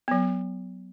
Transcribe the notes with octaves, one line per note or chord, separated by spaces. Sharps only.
F#3 B3